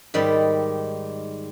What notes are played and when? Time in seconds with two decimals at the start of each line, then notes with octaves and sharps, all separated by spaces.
0.14 G#2 D#3 G3 D5 B5